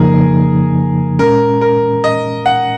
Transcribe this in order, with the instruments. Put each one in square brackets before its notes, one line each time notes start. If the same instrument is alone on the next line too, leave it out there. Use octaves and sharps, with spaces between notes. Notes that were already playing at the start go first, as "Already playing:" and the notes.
Already playing: [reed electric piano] F2 C#3 F3 A#3 D#4 [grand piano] G#4 A#4
[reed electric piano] A#2 G#3 C#4 [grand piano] A#4
[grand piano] A#4
D#5
F#5